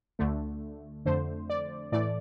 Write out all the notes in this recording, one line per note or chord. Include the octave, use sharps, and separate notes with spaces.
D2 D3 A3
F2 D3 A3 C5
D5
A2 E3 A3 D5